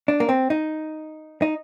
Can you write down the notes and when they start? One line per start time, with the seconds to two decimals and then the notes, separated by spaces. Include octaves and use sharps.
0.08 D4
0.20 A#3
0.29 C4
0.50 D#4
1.42 D#4